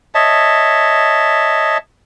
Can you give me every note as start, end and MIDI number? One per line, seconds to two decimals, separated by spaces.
0.15 1.78 73
0.15 1.78 75
0.15 1.78 76
0.15 1.78 81